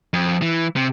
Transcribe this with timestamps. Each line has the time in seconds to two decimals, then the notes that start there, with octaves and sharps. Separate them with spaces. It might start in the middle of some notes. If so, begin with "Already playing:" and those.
0.13 F2
0.42 E3
0.76 C3